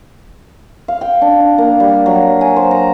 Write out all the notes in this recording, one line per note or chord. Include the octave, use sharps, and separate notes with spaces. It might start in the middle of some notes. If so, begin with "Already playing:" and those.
F5
G5
D4
D4
A#3
G3
F#3
G#5
C5
A#5